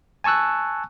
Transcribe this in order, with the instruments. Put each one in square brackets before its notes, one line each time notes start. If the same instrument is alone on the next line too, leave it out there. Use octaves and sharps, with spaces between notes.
[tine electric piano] G#5 A5 C#6 E6 F#6